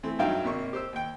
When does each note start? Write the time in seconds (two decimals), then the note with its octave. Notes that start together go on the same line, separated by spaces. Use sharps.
0.03 E3 A3 C4
0.19 G2 F#3 D#4 E5 F5 G5
0.43 G#1 C3 A#3 C#6
0.73 G4 C5 E6
0.93 D#2 G5